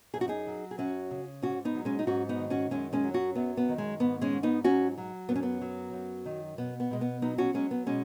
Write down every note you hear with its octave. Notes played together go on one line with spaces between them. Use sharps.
F#2 G#4
F#4
D#4 G#4
F#3
G#4
F#2 C#4 F#4
C#3
G#2 C#4 F#4
B3 D#4
F#3
G#3 C#4
D#4
G#2 C#4 F#4
B3 D#4
D#3
C#4 F#4
F#2 G#3 C#4
G#3 C#4
F#3
C#4 F#4
F#2 B3
B3
D#3
G#3
G#2 B3
G#3 C#4
G#2
B3 D#4
F#3 C#4 F#4
F#3
F#2 B3
C#4
B3
F#3
F#2
D#3
B2 B3
B3
B2 G#3
B3
F#3 B3 D#4
C#4 F#4
F#3 G#3 C#4
B3
B2 G#3 C#4